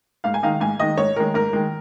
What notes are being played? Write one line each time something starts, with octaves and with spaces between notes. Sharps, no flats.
G#2 F5
G#5
D#3 G#3 D#4 F5
G#2 G#5
D#3 G#3 D#4 D#5
G#2 C#5
D#3 G#3 A#4
G#2 A#4
D#3 G#3